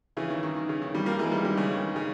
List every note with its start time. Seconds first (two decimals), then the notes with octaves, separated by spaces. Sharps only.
0.17 C#3 E3
0.30 D#3
0.43 D#3
0.56 D#3
0.69 C#3
0.82 D#3
0.94 D#3 G3
1.06 G3 A#3
1.19 E3 G#3
1.32 D#3 G3
1.45 D#3 G3
1.57 C#3
1.71 D#3
1.96 C#3